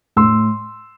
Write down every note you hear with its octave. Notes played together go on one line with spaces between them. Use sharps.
A2 C6 E6